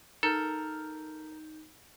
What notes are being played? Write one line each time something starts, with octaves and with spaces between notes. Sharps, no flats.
D#4 A4 A#4 G6